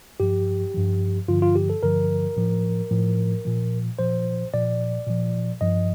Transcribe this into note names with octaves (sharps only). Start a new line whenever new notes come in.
G2 F3 G4
G2 F3
G2 D3 F3 F4
F4
G4
A4
G2 D3 F3 A#4
A2 F3
A2 F3
A#2 F3
A#2 F3 C5
A#2 F3 D5
A#2 F3
G2 F3 D#5